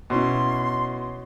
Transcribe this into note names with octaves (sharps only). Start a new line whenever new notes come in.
B2 C#4 E4 C6